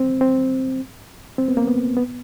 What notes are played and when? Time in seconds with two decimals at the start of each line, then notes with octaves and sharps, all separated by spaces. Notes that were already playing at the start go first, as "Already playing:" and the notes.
Already playing: C4
0.21 C4
1.38 C4
1.48 B3
1.57 A#3
1.68 B3
1.97 B3